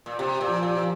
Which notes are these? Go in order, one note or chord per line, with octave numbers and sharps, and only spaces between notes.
A#2
C3 G4
A#2
F3
A#2
F3